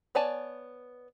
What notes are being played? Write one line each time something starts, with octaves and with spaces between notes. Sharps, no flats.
B3 C#5 D5 G#5 A5